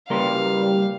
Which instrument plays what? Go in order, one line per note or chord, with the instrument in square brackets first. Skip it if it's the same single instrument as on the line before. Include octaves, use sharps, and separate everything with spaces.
[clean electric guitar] C#3 A#3 C6 [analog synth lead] G3 [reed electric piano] A#4 B4 [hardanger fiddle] F5